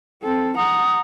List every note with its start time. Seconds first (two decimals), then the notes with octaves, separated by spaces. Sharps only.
0.23 C4 A4
0.57 F#5 A#5 D#6